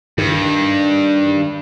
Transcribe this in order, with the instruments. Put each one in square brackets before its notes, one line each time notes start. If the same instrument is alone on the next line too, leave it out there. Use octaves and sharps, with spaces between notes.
[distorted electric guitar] G2 [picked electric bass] D#3